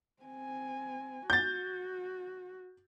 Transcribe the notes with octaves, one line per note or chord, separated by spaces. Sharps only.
C4 G#5
F#4 G6 A6